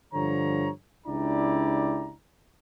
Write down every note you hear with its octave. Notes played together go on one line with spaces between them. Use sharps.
G2 D3 F3 C#5 A#5
C#2 D4 E4 G4 D5 A#5